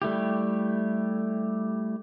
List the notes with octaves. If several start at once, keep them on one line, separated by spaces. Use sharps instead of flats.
G3 A3 E4 G4